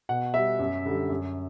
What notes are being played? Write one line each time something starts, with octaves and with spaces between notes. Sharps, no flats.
B2 F#5
G3 E5
F#2
D3 G3
F#2